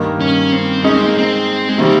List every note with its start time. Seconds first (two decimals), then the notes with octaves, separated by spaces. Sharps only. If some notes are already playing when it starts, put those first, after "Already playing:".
Already playing: G2 D#3 A#3 D#4 A#4
0.20 C#4
0.52 C4
0.84 G#3 C#4 D#4 G#4
0.95 C4
1.06 A#3
1.18 C4
1.69 G#3
1.78 C3 D#3 G3 A#3